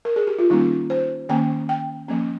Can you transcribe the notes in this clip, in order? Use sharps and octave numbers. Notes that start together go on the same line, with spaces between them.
A#4
G#4
G4
F4
D#3 G3 A#3 C#4 D#4
C5
D#3 A#3 C#4 G5
G5
F3 A#3 C#4